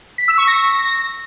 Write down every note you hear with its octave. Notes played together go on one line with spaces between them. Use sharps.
B6
E6
C#6
A#6